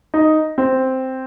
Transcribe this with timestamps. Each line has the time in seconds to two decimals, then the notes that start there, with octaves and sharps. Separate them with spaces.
0.14 D#4
0.58 C4